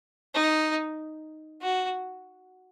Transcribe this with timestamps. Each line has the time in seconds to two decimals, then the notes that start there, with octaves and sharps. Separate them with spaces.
0.35 D#4
1.62 F#4